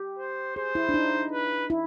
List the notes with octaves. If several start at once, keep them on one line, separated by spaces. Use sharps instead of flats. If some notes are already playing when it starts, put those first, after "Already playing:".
Already playing: G4
C5
G#4 C5
E4
D4
D#4
B4
E4